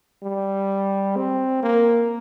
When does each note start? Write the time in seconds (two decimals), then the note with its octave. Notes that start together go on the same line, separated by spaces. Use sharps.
0.23 G3
1.16 C4
1.63 A#3